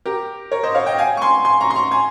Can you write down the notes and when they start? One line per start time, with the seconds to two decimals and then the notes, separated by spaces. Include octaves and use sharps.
0.06 G4 A#4
0.52 A#4 C#5
0.63 C5 D#5
0.75 C#5 F5
0.86 D#5 G5
0.98 F5 G#5
1.17 C#6
1.21 G#5 C6
1.45 G#5 C6
1.60 A#5 C#6
1.70 C6
1.76 A#5 C#6
1.91 G#5 C6